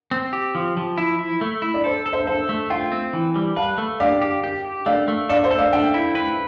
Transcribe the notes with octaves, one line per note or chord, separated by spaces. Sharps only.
C4
G4
F3
F3
E4
E4
A3
E4
D5
A4 C5
A4
C5 E5
A4 C5 E5
A3
F4 E5 G5
C4
E3
G3
B4 F5 A5
A3
G4 D5 F5
G4
G4
G4
A3 D5 F5
A3
A4 D5 F5
C5 E5
A4
D5 F5
A3 E5 G5
E4
B4